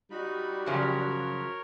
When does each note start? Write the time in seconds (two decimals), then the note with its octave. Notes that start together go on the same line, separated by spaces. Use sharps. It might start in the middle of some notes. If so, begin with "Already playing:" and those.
0.11 G3 D#4 F#4 B5
0.66 F#2 C#3 F3 A#4 C#5